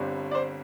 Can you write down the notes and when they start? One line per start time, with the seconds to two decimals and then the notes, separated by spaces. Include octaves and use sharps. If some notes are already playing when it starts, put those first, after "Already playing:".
Already playing: G1 G2 D3 G3 C4
0.31 D5
0.35 C5